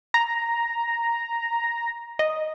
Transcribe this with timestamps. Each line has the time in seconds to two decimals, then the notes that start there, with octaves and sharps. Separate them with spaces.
0.14 A#5
2.19 D#5